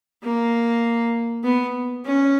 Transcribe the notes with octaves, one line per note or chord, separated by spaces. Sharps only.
A#3
B3
C#4